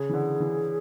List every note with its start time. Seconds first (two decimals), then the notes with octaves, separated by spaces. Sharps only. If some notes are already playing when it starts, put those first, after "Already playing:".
Already playing: C#3 G#4
0.09 E3
0.13 D3
0.40 E3